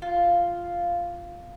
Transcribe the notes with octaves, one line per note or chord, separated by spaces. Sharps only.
F4